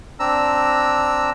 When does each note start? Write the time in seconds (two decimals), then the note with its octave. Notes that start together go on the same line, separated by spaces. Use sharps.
0.20 C4 D4 A#5 E6